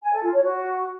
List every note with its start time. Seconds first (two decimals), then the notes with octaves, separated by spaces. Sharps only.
0.02 G#5
0.12 A4
0.22 F4
0.33 C#5
0.43 F#4